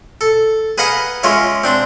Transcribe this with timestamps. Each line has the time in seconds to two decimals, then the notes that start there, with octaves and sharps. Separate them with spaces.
0.21 A4
0.78 G#4 B4 D#5 F5 F#5 A#5
1.23 G#3 C#4 F4 C#5 E5
1.64 C4 D4 C5